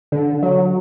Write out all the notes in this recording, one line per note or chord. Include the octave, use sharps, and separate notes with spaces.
D3
F#3